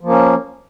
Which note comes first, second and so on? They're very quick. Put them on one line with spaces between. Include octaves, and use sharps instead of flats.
F3 A#3 C#4